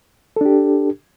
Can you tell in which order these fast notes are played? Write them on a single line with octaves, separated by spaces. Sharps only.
A4 D4 G4